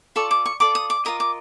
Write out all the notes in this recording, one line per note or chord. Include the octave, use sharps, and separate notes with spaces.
F4 A4 D5 C#6
D6
C#6
F4 A4 D5 D6
D#6
D6
F4 A#4 D#5 D#6
D6